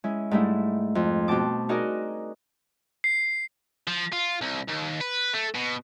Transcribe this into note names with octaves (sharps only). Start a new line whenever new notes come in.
G#3 C#4 E4
G#2 G3 A3 D4 E4
F2
B2 C4 F#4 G5 A5 D6
D#4 F#4 G#4 A#4 D5 D#5
C7
F3
F4
C2
D#2
B4
A3
B2